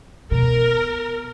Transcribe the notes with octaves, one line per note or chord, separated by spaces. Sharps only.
B2 A#4